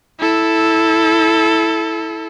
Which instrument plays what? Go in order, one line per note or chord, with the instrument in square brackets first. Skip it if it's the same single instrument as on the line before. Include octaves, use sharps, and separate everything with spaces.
[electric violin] E4 A4